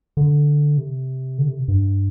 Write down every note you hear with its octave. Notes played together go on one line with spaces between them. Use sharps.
D3
C3
D3
C3
G2